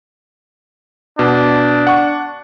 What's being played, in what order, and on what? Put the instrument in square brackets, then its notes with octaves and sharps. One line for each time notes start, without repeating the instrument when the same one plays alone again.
[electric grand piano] B2 [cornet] D4
[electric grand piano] F#5 C#6